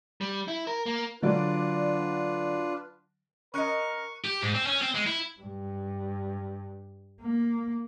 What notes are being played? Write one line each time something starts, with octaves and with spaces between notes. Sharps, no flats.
G3
E4
A#4
A#3
D3 F#3 D4 F4 B4 D5
C#4 A#4 D#5 C#6 F#6 C#7
G4
G#2
C4
C#4
C4
G#3
E4
G2
A#3